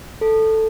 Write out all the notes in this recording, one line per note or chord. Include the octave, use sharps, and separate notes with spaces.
A4